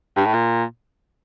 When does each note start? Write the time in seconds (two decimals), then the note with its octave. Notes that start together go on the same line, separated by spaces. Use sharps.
0.17 G2
0.26 A2
0.34 A#2